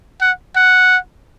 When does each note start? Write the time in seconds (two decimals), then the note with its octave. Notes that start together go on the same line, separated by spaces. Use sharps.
0.21 F#5
0.56 F#5